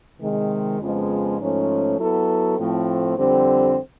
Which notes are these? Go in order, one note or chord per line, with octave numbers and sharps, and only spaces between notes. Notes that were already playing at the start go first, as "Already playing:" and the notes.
C3 D#3 G#3
F2 C#3 F3 G#3 B3
G#2 F3 A3 C#4
F#3 B3 E4 A4
A2 F3 A3 C4
F2 D3 G3 C4